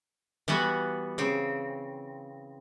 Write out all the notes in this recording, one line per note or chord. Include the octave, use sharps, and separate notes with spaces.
E3 G3 B3 F#4
C#3 C4